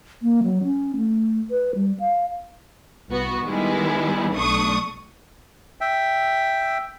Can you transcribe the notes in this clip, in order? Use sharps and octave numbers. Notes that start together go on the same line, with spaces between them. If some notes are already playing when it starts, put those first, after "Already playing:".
A#3
F#3
C#4
A3
B4
G3
F5
C2 B3 F#4
D#3 G3 G#3 B3 E4
B1 A3 D4 C#6 D#6
E5 G5